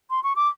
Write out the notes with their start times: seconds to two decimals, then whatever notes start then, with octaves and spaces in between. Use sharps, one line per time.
0.10 C6
0.24 C#6
0.36 D6